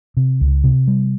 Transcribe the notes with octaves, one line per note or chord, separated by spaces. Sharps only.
C3
C#2
C3
G3